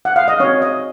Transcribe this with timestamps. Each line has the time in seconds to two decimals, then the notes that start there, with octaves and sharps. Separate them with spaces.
0.05 F#5
0.16 F5
0.28 D#5
0.40 C4 F#4 C#5
0.62 D#5